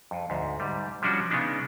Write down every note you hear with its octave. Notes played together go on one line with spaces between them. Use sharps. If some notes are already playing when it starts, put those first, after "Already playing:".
F2
D2 G#2
G#2 G3
F3 G3 C#4 D4 F#4
C#3 G#3 B3 D4 D#4